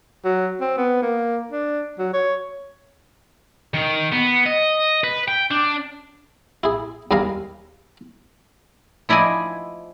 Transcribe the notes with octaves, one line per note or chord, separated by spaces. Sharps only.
F#3
C4
B3
A#3
D4
F#3
C#5
D#3
B3
D#5
B4
G5
D4
E4 G#4
D#2 G3 A#4 F5 G#5 A#5
F3 E4 D5 D#5 G#5